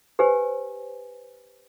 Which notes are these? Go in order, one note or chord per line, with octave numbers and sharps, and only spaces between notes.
G4 B4 C5 G#5